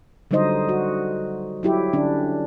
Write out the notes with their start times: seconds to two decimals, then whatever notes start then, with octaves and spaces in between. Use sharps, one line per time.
0.31 D3 F#3 G3 D#4 C5 D#5
0.69 F#4
1.63 F#3 E4 G4
1.93 D3 C#4 D4